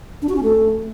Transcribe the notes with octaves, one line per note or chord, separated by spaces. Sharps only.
D4
F#4
C#4
A3